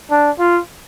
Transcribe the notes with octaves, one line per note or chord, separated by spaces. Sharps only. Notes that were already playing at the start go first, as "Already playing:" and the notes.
D4
F4